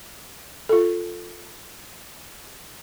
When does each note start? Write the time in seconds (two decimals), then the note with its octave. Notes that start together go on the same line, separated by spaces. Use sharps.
0.69 F4 A4